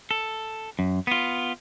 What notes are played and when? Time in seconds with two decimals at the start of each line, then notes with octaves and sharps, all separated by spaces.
0.11 A4
0.79 F#2
1.07 B3 F4